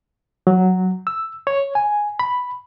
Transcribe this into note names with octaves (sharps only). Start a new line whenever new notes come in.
F#3
E6
C#5
G#5
B5